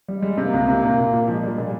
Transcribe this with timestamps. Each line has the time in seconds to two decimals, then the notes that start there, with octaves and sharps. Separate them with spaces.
0.09 G3
0.16 G#3
0.22 G3
0.37 C3 A#3
0.53 C#2
0.68 C3
0.83 A#2
0.98 A#2
1.13 A#2
1.28 F3 G#3
1.39 A#2 G3
1.51 G#3
1.58 A#2 G3